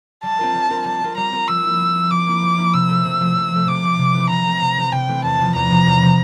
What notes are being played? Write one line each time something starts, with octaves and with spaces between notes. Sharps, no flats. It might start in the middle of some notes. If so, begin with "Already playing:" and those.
G3 A5
C4 F4 A#4
G3
C4 F4 A#4
G3 A5
C4 F4 A#4
G3 A#5
C4 F4 A#4
F3 E6
A#3 E4
F3
A#3 E4
F3 D6
A#3 E4
F3
A#3 E4
C3 E6
F3 A3
C3
F3 A3
C3
F3 A3
C3 D6
F3 A3
C3
E3 A3 C4
C3 A#5
E3 A3 C4
C3
E3 A3 C4
C3 G5
E3 A3 C4
E2 A5
C3 F3
E2 A#5
C3 F3
E2
C3 F3